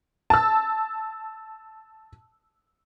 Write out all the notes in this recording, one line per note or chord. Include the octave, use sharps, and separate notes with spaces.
A5 E6